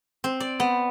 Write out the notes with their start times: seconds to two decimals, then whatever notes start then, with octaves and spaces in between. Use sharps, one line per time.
0.24 C4
0.40 D5
0.60 B3